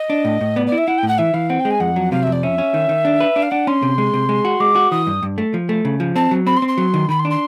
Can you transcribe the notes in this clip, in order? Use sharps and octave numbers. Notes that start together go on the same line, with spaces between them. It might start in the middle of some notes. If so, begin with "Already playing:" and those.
Already playing: D#5
D4
A2
A2
B3 D5
D5
E4
E5
E4 F#5
G5
A2 F#5
E3 E5
E3 F5
C4 F#5
G5
G#3
G#5
F2 F#5
F#3
C3 F5
F2 E5
D5
C#4 E5
C#4
D#3
D#3
D4
B4
D4
F5
D4 F#5
C#4 C6
C3
G#3
C3
G#3
F#4
G#3 D6
F#4
E3 D#6
G2
G2
A3
F3
A3
C#3
F3
C4 A5
F#3
C4 B5
C6
C4
C6
F#3
D#3
D#3 B5
C6
D4
C6